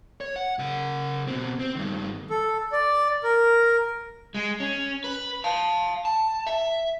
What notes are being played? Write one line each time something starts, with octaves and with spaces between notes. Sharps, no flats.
C#5
F#5
C#3 F#5
B2 C4
C4
G2 D#3
A4
D5
A#4
G#3
C#4
B4
F5 A5
A5
E5